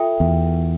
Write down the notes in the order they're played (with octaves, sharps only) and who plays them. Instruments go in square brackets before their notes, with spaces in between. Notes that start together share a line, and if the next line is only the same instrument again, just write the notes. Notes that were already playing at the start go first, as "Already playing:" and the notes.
Already playing: [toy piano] F4 A4 E5 G5
[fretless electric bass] E2